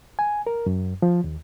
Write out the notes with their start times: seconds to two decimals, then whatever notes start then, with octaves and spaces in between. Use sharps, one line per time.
0.19 G#5
0.47 A#4
0.66 F#2
1.02 F3
1.24 D#2